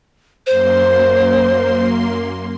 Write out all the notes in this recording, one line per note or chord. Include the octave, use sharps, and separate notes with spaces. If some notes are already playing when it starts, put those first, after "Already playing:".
F#2 A#3 C5 C6